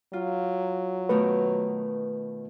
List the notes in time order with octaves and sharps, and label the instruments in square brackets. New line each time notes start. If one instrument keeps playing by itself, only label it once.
[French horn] F#3 [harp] F4
[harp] B2 D#3 A3 [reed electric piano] B4